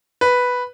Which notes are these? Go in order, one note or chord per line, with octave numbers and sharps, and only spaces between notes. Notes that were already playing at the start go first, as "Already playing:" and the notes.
B4